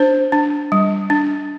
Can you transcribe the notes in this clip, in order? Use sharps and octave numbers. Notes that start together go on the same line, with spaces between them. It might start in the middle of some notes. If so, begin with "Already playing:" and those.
Already playing: D4 C5
D4
G3
D4